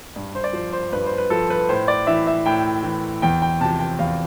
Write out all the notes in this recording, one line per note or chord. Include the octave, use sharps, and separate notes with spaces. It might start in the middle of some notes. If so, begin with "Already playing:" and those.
G2
C5
D5
F3 C5
C5
G2 B4
C5
B4
F3 A4
B4
A2 C5
D5
E3 E5
E5
A2 G5
E3
E2 G5
G5
C3 F3 A5
G5
E2 F5